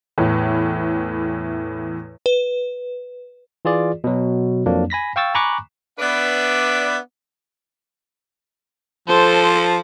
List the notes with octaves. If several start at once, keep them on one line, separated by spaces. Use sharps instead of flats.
E2 A2 E3
B4
E3 F4 G#4 D5
B2 F#3
F2 F3 F#3 A#3 D4
G#5 B5 A#6 B6
F5 G5 C#6 E6 A6
G#5 A#5 B5 C#6 D6 F#6
B3 D4 B4 D5 E5
F3 A4 C5